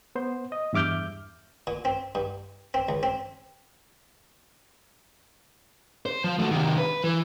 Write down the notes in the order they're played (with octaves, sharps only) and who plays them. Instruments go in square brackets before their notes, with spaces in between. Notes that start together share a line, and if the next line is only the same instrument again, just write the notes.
[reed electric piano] B3 C5
D#5
E2 G2 E5 D6 F6 G6
[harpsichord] A#2
C4
G2
C4
C#2
C4
[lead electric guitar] C5
F3
A3 F#4
C3 D#3
B4
E3